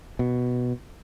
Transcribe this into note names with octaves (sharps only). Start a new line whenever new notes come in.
B2